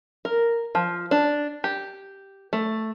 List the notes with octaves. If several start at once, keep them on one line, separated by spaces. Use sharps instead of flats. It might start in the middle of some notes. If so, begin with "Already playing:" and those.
A#4
F3
D4
G4
A3